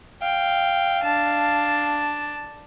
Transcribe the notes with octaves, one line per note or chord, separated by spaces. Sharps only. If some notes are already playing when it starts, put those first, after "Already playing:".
F5 G5
D4 A5